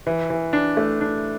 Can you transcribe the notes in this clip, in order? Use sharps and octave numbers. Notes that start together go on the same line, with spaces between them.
E3
E3
D4
A3
D4